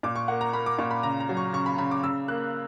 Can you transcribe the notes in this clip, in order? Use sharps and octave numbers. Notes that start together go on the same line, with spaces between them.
A#2 D6
C#6
A#3 F#5
A#5
A#3 B5
D6
A#2 C#6
B5
C#3 A#5
A#5
F#3
C#6
C#3 C#6
B5
C#3 B5
D6
C#3 E6
A#3 F#6